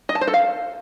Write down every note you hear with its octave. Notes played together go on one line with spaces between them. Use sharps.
D#5
A5
C5
A4
F5